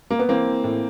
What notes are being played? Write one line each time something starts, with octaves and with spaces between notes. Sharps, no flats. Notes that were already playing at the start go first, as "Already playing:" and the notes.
A#3
B3
E3 A#3 C4
E3
A2